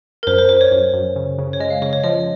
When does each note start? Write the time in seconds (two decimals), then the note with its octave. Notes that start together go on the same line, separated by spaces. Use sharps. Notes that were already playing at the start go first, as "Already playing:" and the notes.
0.23 A#4
0.27 F#2 C5
0.39 C5
0.49 F#2 C5
0.61 C#5
0.71 F#2
0.93 F#2
1.16 C#3
1.38 C#3
1.53 C#5
1.60 G#3 D#5
1.70 F5
1.82 C#3 C#5
1.93 C#5
2.04 F3 D#5